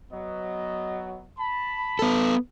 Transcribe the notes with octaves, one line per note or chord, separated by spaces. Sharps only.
F#3 B3 D#5
A5 B5
B3 A4